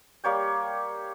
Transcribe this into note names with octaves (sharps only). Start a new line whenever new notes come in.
G3 A#3 C#5 G5